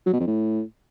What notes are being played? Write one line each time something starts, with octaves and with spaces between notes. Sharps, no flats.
F#3
B2
F2
A2